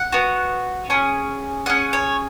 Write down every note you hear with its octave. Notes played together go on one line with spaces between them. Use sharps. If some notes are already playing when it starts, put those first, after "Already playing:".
Already playing: F#5
B3 F#4
C#4 G#4
C#4 G#4 F#5
C#5